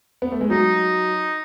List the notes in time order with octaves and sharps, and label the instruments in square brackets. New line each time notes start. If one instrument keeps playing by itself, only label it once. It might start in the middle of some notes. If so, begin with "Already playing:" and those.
[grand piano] B3
A3
G#3
[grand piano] F#3 [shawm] D#4